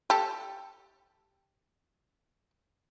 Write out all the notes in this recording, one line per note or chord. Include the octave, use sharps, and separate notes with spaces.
G4 A4